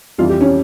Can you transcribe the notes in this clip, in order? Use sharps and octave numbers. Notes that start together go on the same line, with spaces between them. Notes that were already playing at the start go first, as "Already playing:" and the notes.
F2 E3 G3 F4
G4
C#4